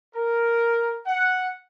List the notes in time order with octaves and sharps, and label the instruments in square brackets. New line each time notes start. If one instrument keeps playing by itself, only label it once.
[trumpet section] A#4
F#5